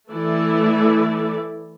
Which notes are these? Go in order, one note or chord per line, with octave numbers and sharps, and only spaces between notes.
E3 A3 E4 A4 D5